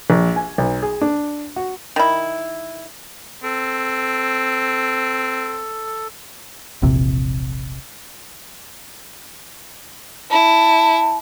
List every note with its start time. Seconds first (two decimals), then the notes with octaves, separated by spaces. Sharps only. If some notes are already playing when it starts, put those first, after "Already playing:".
0.10 A#1
0.36 G#5
0.58 B1
0.83 G#4
1.01 D4
1.56 F#4
1.96 D#3 E4
3.43 C4 A4
6.82 E1 A#1 C3
10.31 E4 A5